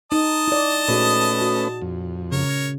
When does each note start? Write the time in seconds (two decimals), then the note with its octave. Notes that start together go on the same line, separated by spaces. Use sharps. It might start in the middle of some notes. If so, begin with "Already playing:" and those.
0.12 D#4 D#5 A5 D#6
0.48 E4 D5
0.88 A#2 A3 C#4 F#4 G#4 B4
1.41 F#4
1.82 F2
2.32 C#3 A#4 C#5